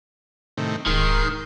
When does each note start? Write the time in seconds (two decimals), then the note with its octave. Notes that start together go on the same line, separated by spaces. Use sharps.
0.57 A2 C3 D#3
0.86 D1 G#2 D#3 C6